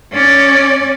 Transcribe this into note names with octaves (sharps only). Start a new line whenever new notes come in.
C#4 D5